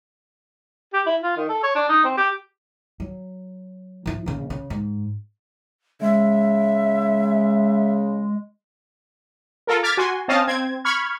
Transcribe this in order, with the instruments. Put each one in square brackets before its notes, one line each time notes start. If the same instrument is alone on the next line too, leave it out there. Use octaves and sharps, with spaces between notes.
[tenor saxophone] G4
E4
F4
D#3
A4
C#5
D4
D#4
C4
G4
[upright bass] F#3
F3 E4
A#1 C#3
C#3
G#2
[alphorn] C#3 [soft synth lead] G#3 [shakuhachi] E5
[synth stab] F4 A4 A#4
D6 F6 G#6 A6 B6
F#4 G#5 C6
C4 C#4 D#5 F5 A5
C4 G#6
B5 C#6 F6 G#6